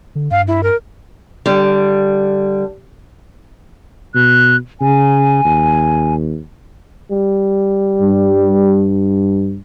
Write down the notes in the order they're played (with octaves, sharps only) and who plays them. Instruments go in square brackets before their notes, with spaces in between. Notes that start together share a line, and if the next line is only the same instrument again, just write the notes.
[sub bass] D3
[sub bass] G2 [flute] F5
[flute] E4
A#4
[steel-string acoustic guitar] D3 G3
[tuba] B2 [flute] F#6
[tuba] C#3 [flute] G#5
[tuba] D#2
[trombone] G3
[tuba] G2